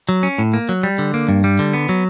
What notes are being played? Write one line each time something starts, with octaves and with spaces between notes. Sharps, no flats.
F#3
C#4
A2
A#3
F#3
G3
D3
A#3
G2
G3
D3
B3
F#3